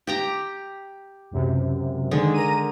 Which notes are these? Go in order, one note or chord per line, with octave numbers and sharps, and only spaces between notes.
G4 G5 A#5
C#2 F#2 C3
D3 D#3 G#3
A#4 A#5 D#7